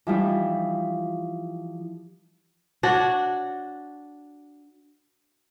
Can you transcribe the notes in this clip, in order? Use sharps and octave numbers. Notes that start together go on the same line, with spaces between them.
E3 F3 G3 D#4
D4 F#4 C#5